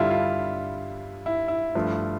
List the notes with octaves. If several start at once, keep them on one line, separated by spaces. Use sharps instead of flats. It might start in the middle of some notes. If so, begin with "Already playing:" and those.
Already playing: G2 D3 G3 E4 F4
F4
E4
E4
G2 F3 A3